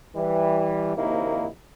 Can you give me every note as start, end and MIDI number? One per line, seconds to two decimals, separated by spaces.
0.16 0.93 52
0.16 0.93 55
0.97 1.47 34
0.97 1.47 39
0.97 1.47 48
0.97 1.47 58
0.97 1.47 63
0.97 1.47 64